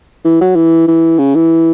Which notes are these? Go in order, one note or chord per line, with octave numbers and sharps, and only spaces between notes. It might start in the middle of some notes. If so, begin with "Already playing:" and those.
E3
F#3
E3
E3
C#3
E3